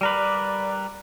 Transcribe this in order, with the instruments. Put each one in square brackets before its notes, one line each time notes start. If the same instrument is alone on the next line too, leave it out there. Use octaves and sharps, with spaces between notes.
[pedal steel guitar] G3 A#4 B4 [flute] D5